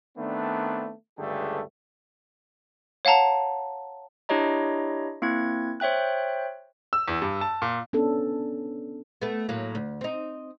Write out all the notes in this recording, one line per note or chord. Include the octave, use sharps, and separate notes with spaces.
D#3 A3 B3 C4 D4
C#2 G2 D3 A3 G4 G#4
C#5 F5 F#5 A5 A#5
D4 E4 G4 C#5 D#5 A#5
A#3 C4 E4 G#6
C5 C#5 E5 G5 F#6
E6
E2
G2
A5
A#2
B3 C#4 D4 A4
A3 B3
A2 F#3 A#3
D2
C4 D#4